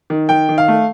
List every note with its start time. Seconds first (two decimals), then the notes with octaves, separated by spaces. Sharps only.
0.10 D#3
0.29 D#3 G5
0.49 D#3
0.58 F5
0.68 A3